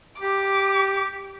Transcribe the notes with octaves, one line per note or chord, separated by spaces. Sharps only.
G4 D6